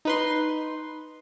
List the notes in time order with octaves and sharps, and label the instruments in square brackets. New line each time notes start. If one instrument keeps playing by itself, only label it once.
[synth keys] D#4 B4 C6